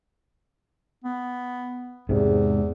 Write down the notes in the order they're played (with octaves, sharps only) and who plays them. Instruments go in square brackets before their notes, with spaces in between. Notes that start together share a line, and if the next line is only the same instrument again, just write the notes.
[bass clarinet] B3
[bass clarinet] E2 [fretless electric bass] G#2 C3 [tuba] G#3